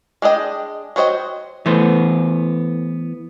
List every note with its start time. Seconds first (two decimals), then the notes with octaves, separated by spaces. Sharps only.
0.22 G#3 D4 G#4 D#5 G5
0.96 F#3 F#4 C5 D#5 G5
1.66 E3 A3 B3 C5